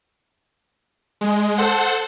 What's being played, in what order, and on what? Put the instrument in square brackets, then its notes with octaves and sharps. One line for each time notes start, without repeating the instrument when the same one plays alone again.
[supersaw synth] G#3
A4 C5 F#5